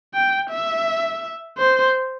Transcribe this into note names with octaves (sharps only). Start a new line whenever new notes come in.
G5
E5
C5